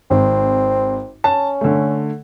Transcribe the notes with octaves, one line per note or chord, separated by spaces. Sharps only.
G#1 C4
C#4 A5
D3 A3